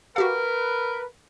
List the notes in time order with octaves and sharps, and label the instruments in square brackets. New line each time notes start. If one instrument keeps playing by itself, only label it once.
[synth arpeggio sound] F#4 G4 F5 [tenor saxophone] A#4 [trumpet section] B4